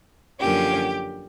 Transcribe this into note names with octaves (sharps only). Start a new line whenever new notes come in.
F#2 D3 F3 A#3 C#4 G4